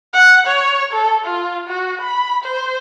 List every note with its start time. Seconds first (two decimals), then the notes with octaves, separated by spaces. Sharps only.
0.14 F#5
0.47 C#5
0.93 A4
1.25 F4
1.68 F#4
2.01 B5
2.44 C5